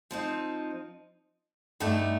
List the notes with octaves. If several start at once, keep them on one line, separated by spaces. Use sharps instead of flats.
F3 C4 D#4
G2 D3 A3 D#4